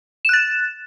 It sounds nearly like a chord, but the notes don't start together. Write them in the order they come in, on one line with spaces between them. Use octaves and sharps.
E7 F#6 A6